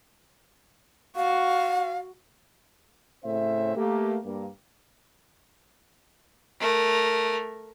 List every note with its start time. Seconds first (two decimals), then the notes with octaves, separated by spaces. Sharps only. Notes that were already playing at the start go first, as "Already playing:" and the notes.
1.16 F#4 F5
3.25 A2 C#3 C4 C5 E5
3.77 A3 A#3 G4
4.24 G2 A#3
6.60 A3 A#4